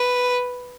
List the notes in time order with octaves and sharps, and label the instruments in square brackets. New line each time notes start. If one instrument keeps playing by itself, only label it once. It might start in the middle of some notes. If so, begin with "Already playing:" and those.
Already playing: [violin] B4